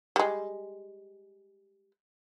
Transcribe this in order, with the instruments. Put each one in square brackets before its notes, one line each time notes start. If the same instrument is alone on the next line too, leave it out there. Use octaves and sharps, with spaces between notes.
[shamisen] G3 G#3